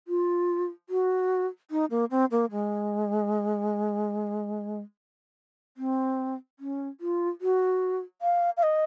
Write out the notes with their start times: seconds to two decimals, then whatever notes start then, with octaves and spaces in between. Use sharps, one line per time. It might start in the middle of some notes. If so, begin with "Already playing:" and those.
0.08 F4
0.89 F#4
1.71 D#4
1.91 A#3
2.11 C4
2.31 A#3
2.51 G#3
5.77 C4
6.59 C#4
7.01 F4
7.41 F#4
8.22 F5
8.57 F5
8.63 D#5